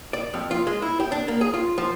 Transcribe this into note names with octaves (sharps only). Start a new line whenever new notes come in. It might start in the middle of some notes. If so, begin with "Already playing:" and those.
D5
F2
F4
G#3
E4
G4
D4
A#3
G#4
F4
F3